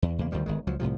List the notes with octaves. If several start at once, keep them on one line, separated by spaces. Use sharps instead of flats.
E2
E2 C#3 A#3
D2 D#3 F3 G3
G1 D#3 G#3
C#2 F3 F#3
C2 A2 C3 F3